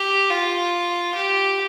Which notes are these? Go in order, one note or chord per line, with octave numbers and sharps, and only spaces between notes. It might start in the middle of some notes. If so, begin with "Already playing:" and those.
Already playing: G4
F4
G4